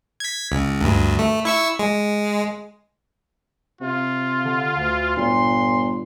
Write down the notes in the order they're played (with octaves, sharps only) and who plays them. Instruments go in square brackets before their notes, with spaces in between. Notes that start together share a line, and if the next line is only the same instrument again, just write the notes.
[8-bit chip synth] G#6 B6
C#2
D2 G2
A3
E4 C#6 E6
G#3
[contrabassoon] C3 [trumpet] F4
[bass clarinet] D3
D2
[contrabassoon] G1 [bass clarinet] A#2 [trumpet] C6